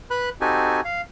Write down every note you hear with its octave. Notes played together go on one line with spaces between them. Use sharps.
B4 B5 F#6
C4 D#4 F#4 G4 A4 G#5
F5